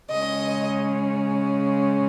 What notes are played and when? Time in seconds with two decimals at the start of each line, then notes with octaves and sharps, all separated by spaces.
0.11 C#3 G#3 C#4 D#5